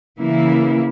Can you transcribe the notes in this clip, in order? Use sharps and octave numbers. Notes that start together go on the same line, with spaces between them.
C#3 E3 A#3 E4